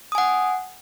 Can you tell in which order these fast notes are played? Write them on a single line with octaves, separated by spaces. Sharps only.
D#6 G#5 F#5